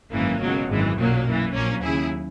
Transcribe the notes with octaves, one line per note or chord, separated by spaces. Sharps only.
G#1 F#2 C#3 E3 A#3
C#2 B2 F#3
G#1 F#2 E3 G#3
B1 A#2 F#3 A#3
F#2 E3
A#1 A#2 F#3 A#3 C#4
D#2 C#3 F#3 E4 G#4